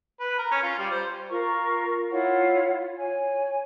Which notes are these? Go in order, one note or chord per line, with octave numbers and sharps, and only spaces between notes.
B4
A#4
C#4
F4
G3
C5
F4 A#4 A#5 C#6
E4 F4 C#5 F#5
C#5 G#5